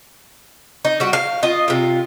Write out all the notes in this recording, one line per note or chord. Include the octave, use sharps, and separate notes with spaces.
D#4
G3 F#4
F5
F4 D#5
C3 F4